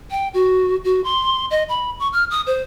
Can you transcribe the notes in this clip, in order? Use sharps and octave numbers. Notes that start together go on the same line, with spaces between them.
G5
F#4
F#4
C6
D#5
B5
C#6
F6
D#6
C5